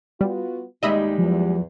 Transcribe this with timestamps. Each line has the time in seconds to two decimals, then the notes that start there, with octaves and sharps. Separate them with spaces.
0.21 G3 B3 F4 F#4
0.83 D#2 G3 G#3 D#4 D#5 E5 B5
1.18 E2 F3 F#3 F4